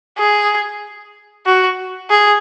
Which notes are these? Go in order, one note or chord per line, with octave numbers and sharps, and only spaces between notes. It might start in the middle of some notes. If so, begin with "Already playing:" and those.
G#4
F#4
G#4